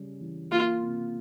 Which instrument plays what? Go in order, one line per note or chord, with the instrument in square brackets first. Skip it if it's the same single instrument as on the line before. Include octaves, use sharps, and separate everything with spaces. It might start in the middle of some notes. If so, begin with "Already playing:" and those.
Already playing: [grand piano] C#3 G3 C#4
E3
[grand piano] A#3 [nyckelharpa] F4
[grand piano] C3